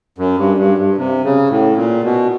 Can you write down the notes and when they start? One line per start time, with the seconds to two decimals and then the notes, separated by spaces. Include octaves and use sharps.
0.18 F#2
0.38 G2
0.57 G2
0.78 G2
0.98 C3
1.25 C#3
1.50 A2
1.77 A#2
2.04 B2